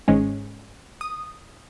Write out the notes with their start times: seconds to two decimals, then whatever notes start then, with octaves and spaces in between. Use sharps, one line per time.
0.08 G#1 G#2 G#3 C#4
1.01 D#6